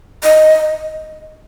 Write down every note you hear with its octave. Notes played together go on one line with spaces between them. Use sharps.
D#5